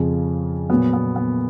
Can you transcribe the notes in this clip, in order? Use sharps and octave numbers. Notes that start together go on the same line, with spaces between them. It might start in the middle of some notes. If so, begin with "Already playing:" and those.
Already playing: F2 C#3 F3
A#2 F#3 B3
B3
B3